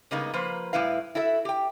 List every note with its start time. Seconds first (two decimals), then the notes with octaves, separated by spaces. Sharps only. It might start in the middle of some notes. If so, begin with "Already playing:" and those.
0.11 C#3 G3 G#3 A#3 B3 D#4
0.33 F3 A#3 B4 C5
0.73 A2 G3 B3 E4 B4 F5
1.15 E4 F#4 A4 E5
1.45 G4 G5